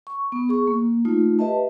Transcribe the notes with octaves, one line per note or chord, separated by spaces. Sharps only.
C#6
B3
G#4 C#6
A#3
A3 D#4 F4
G4 B4 D#5 E5 A5